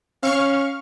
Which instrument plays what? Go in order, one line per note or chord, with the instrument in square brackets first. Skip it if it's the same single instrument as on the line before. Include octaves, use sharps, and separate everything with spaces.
[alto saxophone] C#4 [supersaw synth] F5 C#6 F6